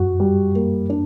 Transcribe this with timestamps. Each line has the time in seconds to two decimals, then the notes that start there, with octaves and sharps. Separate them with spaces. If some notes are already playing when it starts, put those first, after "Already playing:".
Already playing: F#2 F#4
0.20 G3
0.55 A#3
0.90 D4